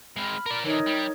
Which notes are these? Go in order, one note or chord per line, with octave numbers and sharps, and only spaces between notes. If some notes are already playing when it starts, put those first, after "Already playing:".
G#3 C4 B5 F6
A#4 D5
D3 E3 D#4 A#4 C#5
G3